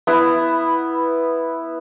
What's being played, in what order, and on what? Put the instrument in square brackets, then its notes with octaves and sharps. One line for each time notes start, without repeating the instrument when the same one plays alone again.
[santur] B3 E4